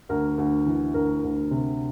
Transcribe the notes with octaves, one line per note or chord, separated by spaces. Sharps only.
D2 A#4
D2
E3
D2 A#4
D2
C3